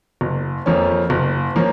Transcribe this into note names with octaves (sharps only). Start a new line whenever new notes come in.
F#1
F2 F3 A#3 C#4
F#1
F3 A#3 C#4